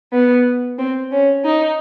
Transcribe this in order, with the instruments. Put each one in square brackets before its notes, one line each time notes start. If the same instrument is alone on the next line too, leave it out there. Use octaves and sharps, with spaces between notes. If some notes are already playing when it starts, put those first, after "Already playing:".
[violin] B3
C4
C#4
D#4